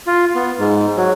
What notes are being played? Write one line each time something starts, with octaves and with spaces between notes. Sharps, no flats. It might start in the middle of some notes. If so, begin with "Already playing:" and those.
F4
B3
G#2
F#3